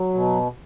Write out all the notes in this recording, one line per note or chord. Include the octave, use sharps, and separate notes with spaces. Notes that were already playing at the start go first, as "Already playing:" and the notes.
Already playing: F#3
B2